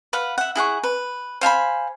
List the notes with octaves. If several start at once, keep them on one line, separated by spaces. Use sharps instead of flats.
B4 F5 F#5
E5 F#5
E4 G#4 F#5 C#6
B4
C5 F5 G#5 B5